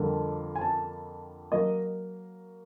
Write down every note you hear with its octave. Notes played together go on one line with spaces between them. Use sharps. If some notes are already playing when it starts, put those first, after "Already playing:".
Already playing: F2 D3 G3 A#3
G#5
A5
F#3 A#3 D#5